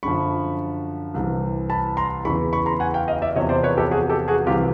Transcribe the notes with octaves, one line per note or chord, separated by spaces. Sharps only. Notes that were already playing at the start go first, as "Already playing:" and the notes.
F#2 D3 F3 B5 C#6
C2 C3 E3
A5 B5
A#5 C6
E2 C#3 E3 B5 C#6
B5 C#6
A#5 C6
F#5 G#5
F5 G5
D#5 F5
D5 E5
E2 C3 F3 C#5 D#5
C5 D5
B4 C#5
G4 A4
F#4 G#4
G4 A4
F#4 G#4
C2 C3 E3 F4 G4